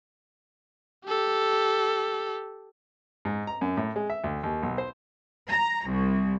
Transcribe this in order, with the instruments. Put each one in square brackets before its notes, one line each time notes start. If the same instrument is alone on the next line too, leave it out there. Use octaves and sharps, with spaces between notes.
[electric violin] G4 A4
[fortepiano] G#2
A#5
F#2
A2
G#3
E5
D2
D#2
B1
C5
[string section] A#5
C2